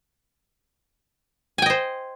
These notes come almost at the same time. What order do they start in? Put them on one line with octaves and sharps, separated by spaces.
G#5 G5 D#5 C5